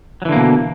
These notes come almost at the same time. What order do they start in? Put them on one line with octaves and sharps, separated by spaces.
F#3 E3 D3 A#3 B2